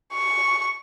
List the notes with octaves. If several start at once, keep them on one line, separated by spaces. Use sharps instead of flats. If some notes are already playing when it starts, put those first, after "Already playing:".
C#6